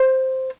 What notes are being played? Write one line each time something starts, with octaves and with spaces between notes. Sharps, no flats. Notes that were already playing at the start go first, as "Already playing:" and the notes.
Already playing: C5